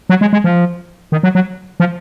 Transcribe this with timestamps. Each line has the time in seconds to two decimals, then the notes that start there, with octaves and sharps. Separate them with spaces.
0.10 F#3
0.21 G#3
0.33 G#3
0.44 F3
1.12 D#3
1.23 F#3
1.35 F#3
1.80 F3